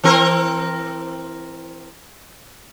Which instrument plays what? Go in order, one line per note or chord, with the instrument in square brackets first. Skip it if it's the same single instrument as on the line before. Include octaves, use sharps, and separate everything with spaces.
[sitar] E3 C4 A#4